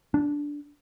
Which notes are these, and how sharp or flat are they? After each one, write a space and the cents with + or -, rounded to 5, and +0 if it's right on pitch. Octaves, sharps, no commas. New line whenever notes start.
D4 -10